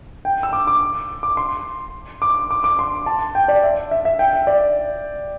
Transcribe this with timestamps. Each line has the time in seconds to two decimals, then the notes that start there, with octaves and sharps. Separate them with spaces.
0.25 G5
0.43 E6
0.53 D6
0.67 D6
1.23 D6
1.37 C6
2.22 D6
2.51 D6
2.64 D6
2.79 C6
3.06 A5
3.35 G5
3.48 D5
3.63 E5
3.91 E5
4.05 E5
4.19 G5
4.33 E5
4.47 D5